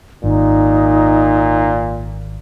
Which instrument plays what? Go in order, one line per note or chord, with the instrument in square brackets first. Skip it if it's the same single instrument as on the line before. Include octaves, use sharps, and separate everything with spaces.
[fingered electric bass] G#1 [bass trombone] A#2 [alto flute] D#4